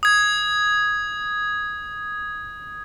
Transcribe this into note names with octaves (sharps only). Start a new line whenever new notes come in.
D#6 G#6